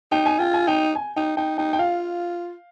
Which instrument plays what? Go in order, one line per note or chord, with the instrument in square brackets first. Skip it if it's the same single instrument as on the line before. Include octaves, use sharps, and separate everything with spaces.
[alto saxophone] D#4 [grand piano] G5
[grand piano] G#5
[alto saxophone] F4 [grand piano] G5
[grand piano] G#5
[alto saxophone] D#4 [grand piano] G5
[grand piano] G#5
[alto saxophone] D#4 [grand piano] G5
[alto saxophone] D#4 [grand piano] G5
[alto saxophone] D#4 [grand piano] G5
[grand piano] G5
[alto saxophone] F4 [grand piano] F5